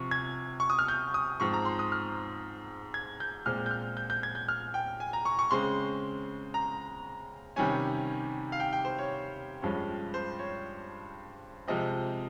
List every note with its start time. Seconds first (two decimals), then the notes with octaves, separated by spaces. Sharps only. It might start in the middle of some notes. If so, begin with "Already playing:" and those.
Already playing: C3 F3 C#6
0.11 G#6
0.60 C#6
0.70 D#6
0.79 F6
0.88 G6
1.14 D#6
1.40 G#2 F3 C4 C#6
1.54 A#5
1.65 C6
1.79 D#6
1.92 F6
2.94 G#6
3.20 G6
3.45 A#2 G#3 C4 F6
3.66 G6
3.71 F6
3.97 G6
4.10 G6
4.23 G#6
4.35 G6
4.48 F6
4.74 G5
5.00 G#5
5.13 A#5
5.25 C#6
5.39 C#6
5.51 C#3 G#3 C4 C6
6.54 A#5
7.56 C3 D#3 G3 C#4 G#5
8.52 F5
8.60 G5
8.73 G5
8.85 C5
8.99 C#5
9.62 G2 F3 G#3 C#4
10.14 C5
10.39 C#5
11.68 C3 F3 G#3 C4 D#5